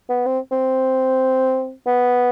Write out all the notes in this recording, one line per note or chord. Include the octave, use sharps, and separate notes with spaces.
B3
C4
C4
B3